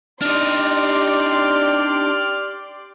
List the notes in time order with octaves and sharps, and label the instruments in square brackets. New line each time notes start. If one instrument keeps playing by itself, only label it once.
[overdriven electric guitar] D4 D#4 [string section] G4 D5 C6 [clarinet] F6